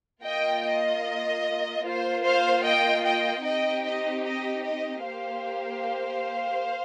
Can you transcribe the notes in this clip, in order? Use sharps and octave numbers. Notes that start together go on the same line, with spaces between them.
A#3 F4 D#5 G5
D#5
A#3 F4 C5
C5 F5
D#5 G5
D#5 G5
C4 D#4 G4 D#5 G5
D#5
D#5
D#5
A#3 G4 C5 F5